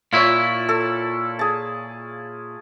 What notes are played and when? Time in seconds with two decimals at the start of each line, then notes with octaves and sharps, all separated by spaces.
0.13 A#2 E4 F4 C#5 E5
0.69 A4
1.39 G#4 A5